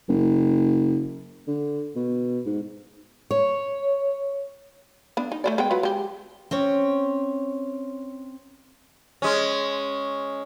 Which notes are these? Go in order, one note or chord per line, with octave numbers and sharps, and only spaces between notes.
F#1
D3
B2
G#2
C#5
B3 D4
D#4
A3 C5 D5
G#3 B3 G5
F#3 F4 B4
G#3 G4
C4 C#4 C#5
G#3 C#4